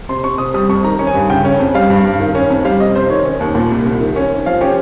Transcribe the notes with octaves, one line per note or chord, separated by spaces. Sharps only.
C3 C6
C3 C#6
C3 D#6
G3 D#6
F2 C#6
D#3 A#5
C#4
G#5
G2
C#3 G5
C#4
F2
G3 F5
G2
G2
D#3
C#4
F2
G3 F5
C3 D#5
C3 C5
D#3 C#5
C#4
D#2
A#2
C2
C2
D#3
C#4
C3
F3 F5
C#4 G4